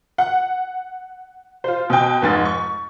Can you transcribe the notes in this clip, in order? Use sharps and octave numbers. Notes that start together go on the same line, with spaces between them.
F#5
F4 C5
B2 G5
F1 G#2 A6
C#6